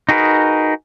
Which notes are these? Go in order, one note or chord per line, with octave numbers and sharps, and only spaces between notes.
D#4 F#4 G#4 A#4 B4